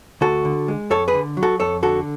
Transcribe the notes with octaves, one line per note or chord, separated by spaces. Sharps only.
D2 F#4 A4
D3
G#3
F2 A4 C#5
G#4 B4
D3
F#3
F#4 A4
F2 A4 C#5
D3 F#4 A4